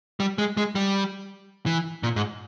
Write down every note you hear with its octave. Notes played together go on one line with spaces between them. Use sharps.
G3
G#3
G#3
G3
E3
A#2
G#2